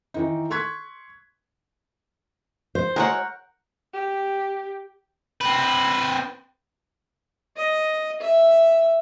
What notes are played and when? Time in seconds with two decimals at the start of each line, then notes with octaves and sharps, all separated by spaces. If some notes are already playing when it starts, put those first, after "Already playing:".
0.14 D#3 E3 D#4
0.50 C6 C#6 F#6 G#6 B6
2.75 C5
2.96 F#3 G#3 A#4 C#5 F#5
3.94 G4
5.41 C4 B4
7.57 D#5
8.21 E5